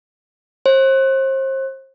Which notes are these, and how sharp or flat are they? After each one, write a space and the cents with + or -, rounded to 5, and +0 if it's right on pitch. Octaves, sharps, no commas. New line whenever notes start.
C5 +35